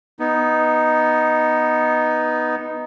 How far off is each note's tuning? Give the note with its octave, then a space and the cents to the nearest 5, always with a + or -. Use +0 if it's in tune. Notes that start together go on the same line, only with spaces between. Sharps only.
B3 +0 D#4 +0